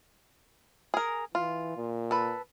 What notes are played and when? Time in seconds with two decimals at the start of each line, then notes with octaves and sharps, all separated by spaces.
0.94 G#4 A#4
1.35 E3 F4
1.77 A#2
2.11 A4 B4